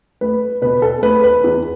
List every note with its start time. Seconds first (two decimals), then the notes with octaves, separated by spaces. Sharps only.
0.21 A3 B4
0.62 B2 B4
0.82 A4
1.02 A3 B4
1.24 B4
1.44 E2